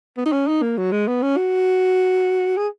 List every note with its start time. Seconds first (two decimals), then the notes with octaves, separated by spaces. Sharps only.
0.18 B3
0.26 D#4
0.32 C#4
0.48 D#4
0.63 A#3
0.78 F#3
0.92 G#3
1.08 B3
1.23 C#4
1.37 F#4
2.57 G#4